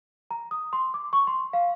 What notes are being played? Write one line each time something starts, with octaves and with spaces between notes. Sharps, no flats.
A#5
D#6
C6
D6
C#6
C6
F5